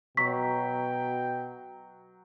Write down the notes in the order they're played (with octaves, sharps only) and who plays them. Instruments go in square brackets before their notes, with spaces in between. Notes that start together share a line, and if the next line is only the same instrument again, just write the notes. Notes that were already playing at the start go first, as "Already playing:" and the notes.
[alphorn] B2 [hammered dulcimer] F#3 [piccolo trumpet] G5 [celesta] C#6 B6